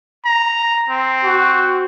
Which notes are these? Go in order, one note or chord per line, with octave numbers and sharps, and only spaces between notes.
A#5
C4
F#4